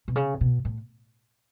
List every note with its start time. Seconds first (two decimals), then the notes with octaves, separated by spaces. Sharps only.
0.08 B2
0.16 C#3
0.41 B2
0.65 A2